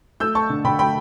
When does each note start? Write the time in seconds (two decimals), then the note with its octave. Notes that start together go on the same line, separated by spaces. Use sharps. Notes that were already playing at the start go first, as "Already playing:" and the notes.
0.20 A3 E6 G6
0.35 A3 A5 C#6
0.50 D3
0.64 D3 G5 B5
0.79 A3 G5 B5